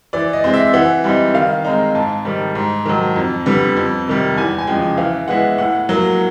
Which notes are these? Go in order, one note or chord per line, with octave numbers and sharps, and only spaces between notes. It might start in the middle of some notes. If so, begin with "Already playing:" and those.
E3 D5
D#5
G#3 C4
E5
E3 F#5
G3 C4 D#4
D#3 F5
G#3 C4 D#4 A#5
G#2 A5
D#3 G3
G#2
D#3 F#3
F2
D3 G3 B3
F2
C3 D#3 G3
E2 G#5
G#5
C#3 F3 G#3 G5
E3 F5
G#3 B3 E4 F#5
A2 F#5
F#3 A#3